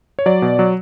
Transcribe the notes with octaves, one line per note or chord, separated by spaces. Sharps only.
C#5
F#3 D5
B2
F#3